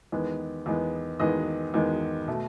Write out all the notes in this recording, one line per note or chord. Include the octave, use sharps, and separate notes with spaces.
E2 D#3 G#3 B3
E2 D#3 G#3 B3
E2 D#3 G#3 B3 B4 D#5
E2 D#3 G#3 B3
B2 A3